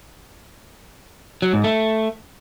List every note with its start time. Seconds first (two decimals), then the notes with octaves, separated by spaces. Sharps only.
1.42 F#3
1.53 G#2
1.64 A3